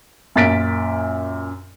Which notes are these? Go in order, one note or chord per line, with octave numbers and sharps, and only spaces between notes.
F#2 A#2 A6 B6 D7